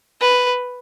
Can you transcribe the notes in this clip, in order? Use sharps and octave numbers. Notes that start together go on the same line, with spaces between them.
B4